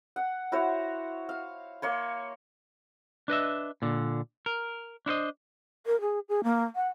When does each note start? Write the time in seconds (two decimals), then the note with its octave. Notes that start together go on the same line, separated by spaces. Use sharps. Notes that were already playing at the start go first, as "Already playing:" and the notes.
0.16 F#5
0.52 E4 F#4 C5 C#5
1.29 F5
1.82 A#3 C#5 C6
3.28 D4 B4 D#5 E5
3.82 A#2 D3
4.46 A#4
5.06 D4 E4 C5 D#5
5.86 A#4
6.01 G#4
6.29 G#4
6.44 A#3
6.75 F#5